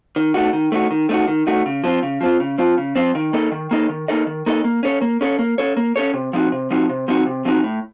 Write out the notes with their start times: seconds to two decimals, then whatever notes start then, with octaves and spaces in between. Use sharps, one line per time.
0.16 D#3
0.34 A3 D#4 F#4
0.53 D#3
0.72 A3 D#4 F#4
0.91 D#3
1.09 A3 D#4 F#4
1.28 D#3
1.47 A3 D#4 F#4
1.66 C#3
1.84 F3 C4 F4
2.03 C#3
2.21 F3 C4 F4
2.40 C#3
2.58 F3 C4 F4
2.78 C#3
2.96 F3 C4 F4
3.15 D#3
3.33 A#3 D#4 A4 D#5
3.52 D#3
3.71 A#3 D#4 A4 D#5
3.89 D#3
4.08 A#3 D#4 A4 D#5
4.27 D#3
4.46 A#3 D#4 A4 D#5
4.64 A#3
4.83 C#4 A4 C#5
5.02 A#3
5.21 C#4 A4 C#5
5.39 A#3
5.58 C#4 A4 C#5
5.77 A#3
5.96 C#4 A4 C#5
6.14 C3
6.33 F3 C4 D#4 F#4
6.52 C3
6.71 F3 C4 D#4 F#4
6.89 C3
7.08 F3 C4 D#4 F#4
7.27 C3
7.45 F3 C4 D#4 F#4
7.64 A2